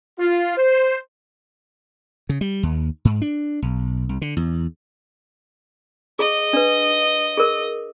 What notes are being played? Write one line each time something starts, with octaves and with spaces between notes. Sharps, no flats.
F4
C5
C#3
G3
D#2
G#2
D4
B1
C2
D3
E2
G#4 D#5
D4 B4
G#4 A#4